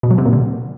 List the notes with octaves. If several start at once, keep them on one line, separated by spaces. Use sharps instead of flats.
B2
F#3
C3
A#2
D3